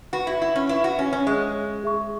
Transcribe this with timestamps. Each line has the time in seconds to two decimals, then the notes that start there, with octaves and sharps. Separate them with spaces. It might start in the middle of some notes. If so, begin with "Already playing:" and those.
0.13 F#4 B4 F#5 B5
0.27 E4
0.42 E4
0.56 C#4
0.69 E4 B4 E5 C#6
0.84 F#4
0.99 C#4
1.13 C#4
1.26 G#3 C#5 E5 C#6
1.84 G#4 E5 C#6